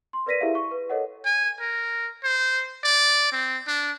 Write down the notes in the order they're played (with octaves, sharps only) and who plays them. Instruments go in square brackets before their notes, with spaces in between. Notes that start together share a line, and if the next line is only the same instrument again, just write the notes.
[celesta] C6
A#4 B4 D5 A#6 B6 D#7
E4 G4 G#4 A#4 E5 F5
C#6
B4
A4 A#4 C#5 D#5 F#5
[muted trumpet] G#5
A#4
C5
D5
C4
D4